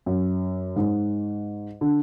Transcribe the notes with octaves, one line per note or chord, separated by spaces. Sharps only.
F#2
G#2
D3